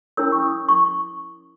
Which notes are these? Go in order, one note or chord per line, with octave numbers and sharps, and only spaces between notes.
C#4 E4 A#4 C#5 E6
C#6
D#6
C#6